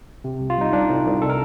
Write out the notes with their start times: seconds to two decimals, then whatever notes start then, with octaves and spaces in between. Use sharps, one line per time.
0.24 C3
0.40 C2
0.50 F4
0.56 C2 D#4
0.73 C2 D4
0.90 C2
1.06 C2
1.22 A4
1.29 A#4